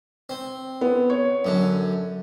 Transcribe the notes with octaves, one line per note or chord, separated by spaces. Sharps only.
C4
B3
C#5
F#2 D3